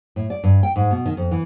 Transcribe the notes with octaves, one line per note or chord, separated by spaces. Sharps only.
A2
D5
G2
G5
G#2
B2
D#3
F2
E3